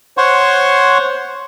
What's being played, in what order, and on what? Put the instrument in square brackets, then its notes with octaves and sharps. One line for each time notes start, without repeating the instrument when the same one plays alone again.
[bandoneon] C5 C#5 F#5 C6 C#6